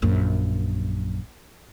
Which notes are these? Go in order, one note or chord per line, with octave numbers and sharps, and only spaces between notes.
A#1 F#2